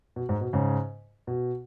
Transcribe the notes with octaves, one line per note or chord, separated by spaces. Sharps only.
B2
G#2
B2
G#2 C#3
B2